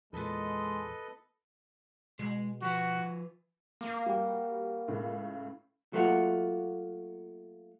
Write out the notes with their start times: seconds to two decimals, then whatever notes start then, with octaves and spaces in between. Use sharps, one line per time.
0.13 E2 A#2 G#3 A4 B4 D#5
2.19 B2 G#3
2.62 F3 F#4 B4
3.81 A#3 D6
4.06 G3 F#4 G5
4.88 C#2 A2 C#3
5.93 F#3 A3 A#3 F4 F#4